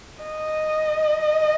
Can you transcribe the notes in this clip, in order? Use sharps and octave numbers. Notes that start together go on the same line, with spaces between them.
D#5